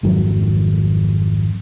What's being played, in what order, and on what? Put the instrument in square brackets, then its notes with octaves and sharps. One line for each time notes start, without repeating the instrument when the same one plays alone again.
[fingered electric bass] G#1 F2 D#3 F#3